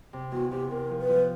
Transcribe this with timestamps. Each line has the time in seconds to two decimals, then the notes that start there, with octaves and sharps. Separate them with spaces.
0.13 C3
0.32 E2 F#4
0.51 C3 G4
0.70 C3 A#4
0.90 F3
0.99 B4
1.09 F3